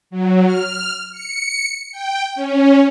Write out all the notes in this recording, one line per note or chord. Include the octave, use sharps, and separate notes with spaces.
F#3
F6
C#7
G5
C#4